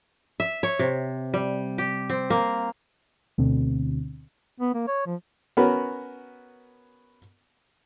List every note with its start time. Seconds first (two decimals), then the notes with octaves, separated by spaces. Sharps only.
0.40 E5
0.63 C#5
0.79 C3
1.34 G3
1.78 G4
2.10 C4
2.30 A#3
3.38 D2 B2 D3 C4
4.60 B3
4.74 A#3
4.87 C#5
5.06 F3
5.57 B3 C#4 F#4 A#4 B4